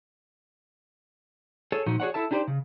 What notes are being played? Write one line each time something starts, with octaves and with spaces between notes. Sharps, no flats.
G#4 A4 C#5
A#2 F3 D#4 F#4
F#4 G#4 A#4 C#5 D5 F#5
E4 A4 E5 A5
D4 D#4 G4 A4 C5 D5
C#3